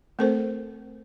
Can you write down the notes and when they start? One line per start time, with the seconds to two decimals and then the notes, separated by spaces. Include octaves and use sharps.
0.19 A3 C4 A4 A#4 C5